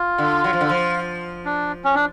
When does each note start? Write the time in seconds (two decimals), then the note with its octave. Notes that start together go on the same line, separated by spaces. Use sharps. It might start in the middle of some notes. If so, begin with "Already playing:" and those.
Already playing: F4
0.18 D3
0.44 F#3
0.53 F3
0.61 D3
0.70 F3
1.45 D4
1.84 C#4
1.95 D4